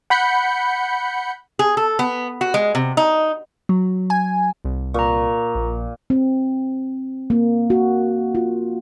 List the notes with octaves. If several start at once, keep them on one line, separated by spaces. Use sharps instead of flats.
F#5 B5 G6 C#7
G#4
A4
B3
F#4
G#3
C3
D#4
F#3
G#5
C2
A#2 A#5 C#6
A#1
C4
A#3
F#4
F4